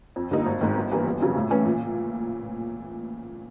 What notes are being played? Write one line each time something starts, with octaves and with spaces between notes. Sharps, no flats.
F2
D3 G3 A#3 D#4
G#1
G#2 D#3
G1
G2 E3 G3 A#3
G1
F2 C#3 F#3
A2
E3 A3 C#4
A#2